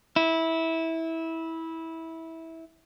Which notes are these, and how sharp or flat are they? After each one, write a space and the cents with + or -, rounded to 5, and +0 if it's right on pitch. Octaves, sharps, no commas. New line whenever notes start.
E4 -15